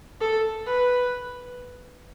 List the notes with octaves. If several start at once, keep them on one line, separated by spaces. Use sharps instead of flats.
A4
B4